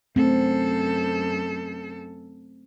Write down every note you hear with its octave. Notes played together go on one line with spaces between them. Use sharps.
F#2 A3 C4 A4